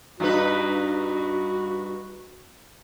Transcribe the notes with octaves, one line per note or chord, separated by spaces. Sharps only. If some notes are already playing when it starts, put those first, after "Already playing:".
G2 D#4 F#4 B4